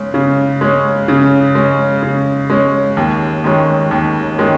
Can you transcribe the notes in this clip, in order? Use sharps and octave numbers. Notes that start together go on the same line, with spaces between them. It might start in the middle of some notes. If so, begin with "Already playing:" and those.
Already playing: C#3 G#3 C#4
C#3
G#3 C#4
C#3
G#3 C#4
C#3
G#3 C#4
D#2
D#3 G#3 C#4
D#2
D#3 G#3 C#4